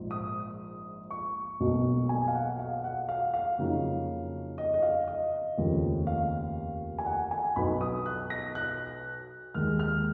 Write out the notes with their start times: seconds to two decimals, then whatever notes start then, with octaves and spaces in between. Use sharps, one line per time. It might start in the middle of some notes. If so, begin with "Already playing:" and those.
Already playing: A#1 G#2 F3
0.11 D#6
1.11 C#6
1.60 B1 B2 F#3 A#3
2.09 G#5
2.28 F5
2.34 F#5
2.59 F5
2.84 F#5
3.09 F5
3.34 F5
3.58 F2 C#3 F#3 A#3 D#4
4.58 D#5
4.74 D#5
4.82 F5
5.08 D#5
5.58 F1 D#2 C#3 F3
6.07 F5
6.99 G#5
7.06 F#5
7.31 G#5
7.56 B1 B2 F#3 B3 D#4 B5
7.81 D#6
8.06 F#6
8.30 A#6
8.55 F#6
9.54 D#2 D#3 G#3 F6
9.79 F6